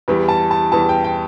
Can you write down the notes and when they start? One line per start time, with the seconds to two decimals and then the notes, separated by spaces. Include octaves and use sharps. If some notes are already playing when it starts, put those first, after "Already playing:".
0.08 E2 E3 G3
0.28 A5
0.51 A5
0.72 E2 E3 G3 A5
0.89 G5
1.04 G5